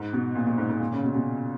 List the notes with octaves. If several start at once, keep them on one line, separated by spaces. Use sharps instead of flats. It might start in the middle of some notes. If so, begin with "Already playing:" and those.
Already playing: G#2
B2
A#2
A#2
G#2
G#2
A#2
C#3
B2
B2